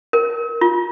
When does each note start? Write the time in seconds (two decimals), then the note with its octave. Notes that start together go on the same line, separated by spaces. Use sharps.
0.13 A#4
0.61 F4